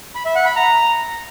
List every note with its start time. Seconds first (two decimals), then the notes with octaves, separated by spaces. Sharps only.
0.15 B5
0.25 E5
0.35 F#5
0.46 B5
0.56 A#5